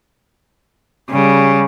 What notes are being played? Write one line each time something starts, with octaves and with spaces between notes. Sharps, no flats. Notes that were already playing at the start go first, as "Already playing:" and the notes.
C#3 G3